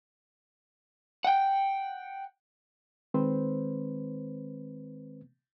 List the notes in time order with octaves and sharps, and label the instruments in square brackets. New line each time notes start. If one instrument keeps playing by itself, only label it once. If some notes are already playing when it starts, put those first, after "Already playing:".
[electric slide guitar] F#5 G5
[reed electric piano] D#3 G#3 C4 B4 C5